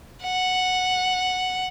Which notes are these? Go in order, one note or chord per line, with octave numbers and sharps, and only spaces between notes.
F#5